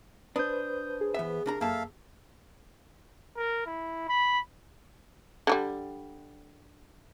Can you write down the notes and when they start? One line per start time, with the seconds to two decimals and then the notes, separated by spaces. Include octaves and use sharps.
0.36 D4 B4 C5 D#6 G6
1.01 G#4
1.14 E3 B3 E5
1.46 C2 D4 A#4 A#5
1.61 F#2 A#3 A4 E5 F5 A5
3.37 A#4
3.66 E4
4.09 B5
5.47 D3 F#3 G3